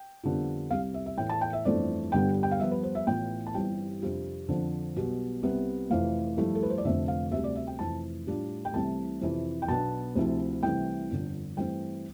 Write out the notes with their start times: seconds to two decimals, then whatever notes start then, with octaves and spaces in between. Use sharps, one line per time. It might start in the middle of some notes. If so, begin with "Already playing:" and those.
Already playing: G5
0.23 F2 D3 G3 B3 F4
0.70 C2 C3 G3 F5
0.94 E5
1.06 E5
1.18 A2 E3 A3 G5
1.29 A5
1.41 G5
1.53 E5
1.65 G1 F2 E3 A3 D4 D5
2.12 G1 G2 D3 G3 B3 G5
2.43 G5
2.51 F5
2.60 G2 F3 B3 E5
2.71 B4
2.83 C5
2.95 E5
3.07 A1 A2 E3 B3 F4 G5
3.47 A5
3.54 G1 G2 E3 G3 C4 G5
4.01 F2 C3 G3 D4 F4
4.48 F2 D3 F3
4.96 B1 B2 G3
5.43 C2 C3 G3 B3
5.90 F1 F2 E3 F5
6.37 G2 F3 A3 E4
6.55 A4
6.63 B4
6.70 C5
6.78 D5
6.85 F1 F2 D3 E5
7.08 F5
7.32 D2 C3 G3 E5
7.44 D5
7.55 E5
7.67 G5
7.79 F1 F2 E3 A5
8.26 A2 G3 D4 F4
8.65 G5
8.73 C2 C3 E3 A3 A5
9.21 F2 C3 E3
9.62 G5
9.68 B1 B2 B3 D4 A5
10.15 D2 C3 F3 C4 E4
10.63 C2 C3 E3 A3 C4 G5
11.10 G1 F2 D3
11.57 G2 E3 A3 C4 G5